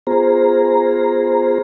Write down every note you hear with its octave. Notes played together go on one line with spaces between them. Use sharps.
B3 F4 G#4 C5 A#5